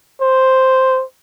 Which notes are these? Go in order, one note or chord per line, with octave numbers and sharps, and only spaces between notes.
C5